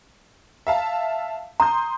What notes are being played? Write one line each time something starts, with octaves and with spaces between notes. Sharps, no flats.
E5 F5 A5
A#5 C6 D#6 G6